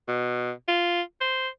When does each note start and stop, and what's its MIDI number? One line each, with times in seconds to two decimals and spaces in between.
0.08 0.52 47
0.68 1.02 65
1.21 1.48 72